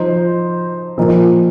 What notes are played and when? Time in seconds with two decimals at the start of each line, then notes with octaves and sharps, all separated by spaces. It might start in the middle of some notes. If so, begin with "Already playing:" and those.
Already playing: F3 D#4 C5
0.98 A#2 F3 D#4 A#4